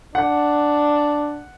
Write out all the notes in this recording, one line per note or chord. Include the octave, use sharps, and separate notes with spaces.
D4 F#5